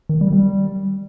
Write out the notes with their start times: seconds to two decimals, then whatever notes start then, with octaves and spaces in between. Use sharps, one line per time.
0.09 D#3
0.21 G3
0.33 G3